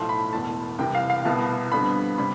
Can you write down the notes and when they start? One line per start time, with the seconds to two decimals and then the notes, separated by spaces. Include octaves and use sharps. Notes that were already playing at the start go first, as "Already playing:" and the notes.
Already playing: B1 A2 F3 A3 C6
0.09 B5
0.32 E1 E2 B2 A5
0.79 C2 C3 E3 G5
0.95 F5
1.10 F5
1.25 C2 B2 B3 E4 A5
1.72 F2 D3 G3 B3 B5
2.18 C3 G3 B5